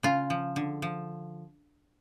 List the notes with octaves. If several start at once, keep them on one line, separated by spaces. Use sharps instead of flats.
C#3 F4
F3
D3
F3